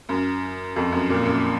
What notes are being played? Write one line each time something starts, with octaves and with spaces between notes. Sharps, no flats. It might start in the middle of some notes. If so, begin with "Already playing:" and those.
F#2
F2
F#2
A#2
F#2